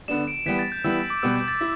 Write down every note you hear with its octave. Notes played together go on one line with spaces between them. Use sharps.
D3 B3 D4 E7
D7
E3 G3 B3 B6
A6
G6
E3 G3 B3 E4 E6
D6
B2 G3 B3 E6
G6
A6
E4